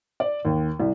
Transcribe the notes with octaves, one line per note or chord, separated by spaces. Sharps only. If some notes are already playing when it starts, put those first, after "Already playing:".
D5
D#2
C2